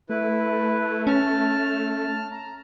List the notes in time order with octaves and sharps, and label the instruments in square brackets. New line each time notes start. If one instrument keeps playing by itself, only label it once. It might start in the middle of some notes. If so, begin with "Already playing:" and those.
[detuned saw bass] A3 [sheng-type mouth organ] E4 B4
[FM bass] C#4 [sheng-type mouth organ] A5 F6
[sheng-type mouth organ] A#5